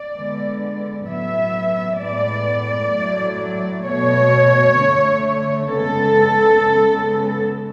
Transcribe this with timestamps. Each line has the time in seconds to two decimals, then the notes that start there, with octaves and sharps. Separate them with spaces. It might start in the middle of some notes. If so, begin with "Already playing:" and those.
Already playing: D5
0.14 D3 G#3 B3
1.07 A2 F#3 B3 E5
1.99 A2 G#3 B3 D5
2.93 A2 F#3 A3
3.85 B2 A3 C#5
4.78 D3 A3
5.70 C#3 G#3 B3 A4
6.63 C#3 G#3 B3